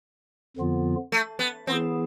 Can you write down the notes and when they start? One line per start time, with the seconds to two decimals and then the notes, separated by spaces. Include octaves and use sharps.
0.57 F2 D3 F3 B3 F4
1.12 A3
1.39 B3
1.67 E3 B3 C4 E4 G#4